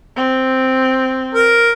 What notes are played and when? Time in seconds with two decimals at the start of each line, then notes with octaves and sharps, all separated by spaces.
0.16 C4
1.35 A#4